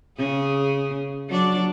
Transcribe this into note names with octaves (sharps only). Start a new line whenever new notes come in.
C#3 G#4
F#3 D4 D5